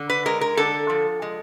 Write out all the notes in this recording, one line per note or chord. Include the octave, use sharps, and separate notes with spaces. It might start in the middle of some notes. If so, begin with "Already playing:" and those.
Already playing: D3
B4
G#3 A#4
A#4
D3 A4
F3
G#3